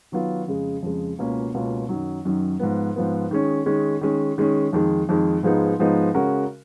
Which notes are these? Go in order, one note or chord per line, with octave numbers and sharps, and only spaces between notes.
D#3 F#3 B3 F4
F2 C#3 G#3
F2 C#3 G#3
C#2 B2 A#3 C#4 F4
C#2 B2 A#3 C#4 F4
F#2 D#3 F#3
F#2 D#3 F#3
G#2 F3 B3
G#2 F3 B3
D#3 G#3 C#4
D#3 G#3 C#4
D#3 G#3 C#4
D#3 G#3 C#4
F2 D#3 G#3
F2 D#3 G#3
G#2 F3 G#3 B3 D#4
G#2 F3 G#3 B3 D#4
C#3 G#3 C#4 F#4 A#4